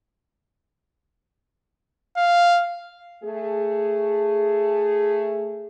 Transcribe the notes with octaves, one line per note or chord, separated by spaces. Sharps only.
F5
A3 G#4